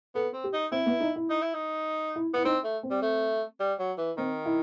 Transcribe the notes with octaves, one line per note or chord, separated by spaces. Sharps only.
B3 A4
C4
G4
D#4
C4 E4
B3
D#4
E4
D#4
E4
D#4
E4
B3 E4
C4 D#4
A3
C4
G3
A3
G3
F#3
E3
D#3 C4
E4